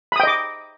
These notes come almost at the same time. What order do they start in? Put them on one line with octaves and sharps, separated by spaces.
B5 D#6 G5 D#5 D6